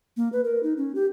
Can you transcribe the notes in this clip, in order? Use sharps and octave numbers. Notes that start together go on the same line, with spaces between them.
A#3
B4
A#4
D#4
C#4
G4